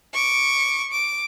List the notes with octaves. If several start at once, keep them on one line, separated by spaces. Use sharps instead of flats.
C#6 D6
D6